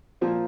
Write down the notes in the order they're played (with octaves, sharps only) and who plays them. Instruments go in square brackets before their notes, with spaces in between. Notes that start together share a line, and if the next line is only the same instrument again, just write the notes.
[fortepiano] A#2 F3 A#3 C5